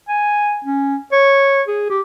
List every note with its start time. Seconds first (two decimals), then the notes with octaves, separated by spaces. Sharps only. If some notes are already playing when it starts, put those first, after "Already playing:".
0.08 G#5
0.64 C#4
1.12 C#5
1.68 G#4
1.90 G4